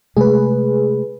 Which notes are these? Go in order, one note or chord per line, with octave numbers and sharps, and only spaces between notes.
C3 G#3 A3 G#4 B4